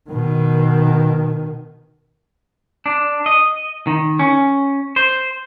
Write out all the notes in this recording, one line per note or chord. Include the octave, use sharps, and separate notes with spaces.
B2 D#3
D4
D#5
D#3
C#4
C5